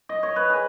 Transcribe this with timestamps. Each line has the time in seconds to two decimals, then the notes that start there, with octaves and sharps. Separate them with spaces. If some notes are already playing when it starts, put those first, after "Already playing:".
0.09 D#5
0.23 C#5
0.36 B4
0.50 G#4